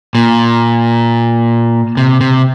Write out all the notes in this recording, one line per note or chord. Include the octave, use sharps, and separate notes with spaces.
A#2
C3
C3